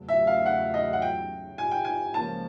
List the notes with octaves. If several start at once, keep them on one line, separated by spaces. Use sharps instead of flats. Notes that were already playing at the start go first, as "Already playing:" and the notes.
Already playing: E2 C#3 F#3 A3
E5
F5
F#5
D#5
F#5
G5
G#5
G5
G#5
C#2 C#3 F3 A#3 C#4 A5